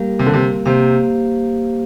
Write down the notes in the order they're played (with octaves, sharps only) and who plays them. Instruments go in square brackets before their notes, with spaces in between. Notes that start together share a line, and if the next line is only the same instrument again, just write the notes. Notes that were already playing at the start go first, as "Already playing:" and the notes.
Already playing: [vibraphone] G3 A#3 G4 A#4 F5
[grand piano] C3
D3
C3
[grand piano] C3 [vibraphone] A#3 G4 C5 F5